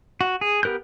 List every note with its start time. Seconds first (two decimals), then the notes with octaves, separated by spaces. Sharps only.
0.21 F#4
0.41 G#4
0.63 B3 G4 A#4 F#6 G6